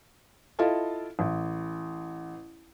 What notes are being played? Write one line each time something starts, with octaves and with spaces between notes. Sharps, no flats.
E4 F4 A4 D#5 F5 A5
A1